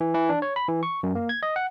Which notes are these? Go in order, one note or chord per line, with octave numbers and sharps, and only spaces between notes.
E3
E3
D4
C#5
B5
E3
C#6
F#2
A#3
G#6
D#5
F#5